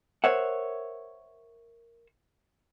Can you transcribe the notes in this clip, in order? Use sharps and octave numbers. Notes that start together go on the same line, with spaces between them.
A#4 C5 C#5 E5 F#5